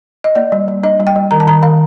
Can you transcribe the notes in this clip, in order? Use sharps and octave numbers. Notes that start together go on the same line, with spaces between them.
D#5
A#3 D5
G3
G3
D4 D#5
G3
G5
G3
D#3 A#5
A5
D#3 A#5
D#3 F5